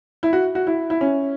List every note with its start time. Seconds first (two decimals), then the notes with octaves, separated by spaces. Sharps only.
0.23 E4
0.33 F#4
0.55 F#4
0.67 E4
0.90 E4
1.01 C#4